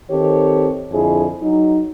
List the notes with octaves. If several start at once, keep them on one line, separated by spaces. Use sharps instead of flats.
D#3 C4 G4 A4 C#5
F2 D3 E4 G#4
F#3 D#4